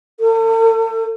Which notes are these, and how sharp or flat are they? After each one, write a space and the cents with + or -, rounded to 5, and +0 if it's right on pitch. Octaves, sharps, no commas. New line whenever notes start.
A4 +40